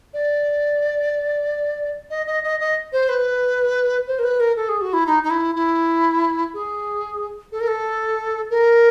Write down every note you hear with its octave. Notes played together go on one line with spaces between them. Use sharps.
D5
D#5
D#5
D#5
D#5
C5
B4
C5
A#4
B4
A#4
A4
G#4
F#4
E4
D#4
D#4
E4
E4
G#4
A4
A#4
A4
A#4